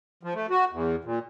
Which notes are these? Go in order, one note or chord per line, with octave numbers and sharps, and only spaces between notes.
F3
A3
F#4
E2
A#2